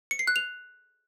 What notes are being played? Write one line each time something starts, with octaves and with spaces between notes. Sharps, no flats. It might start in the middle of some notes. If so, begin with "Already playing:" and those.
C#7
C7
F#6
F7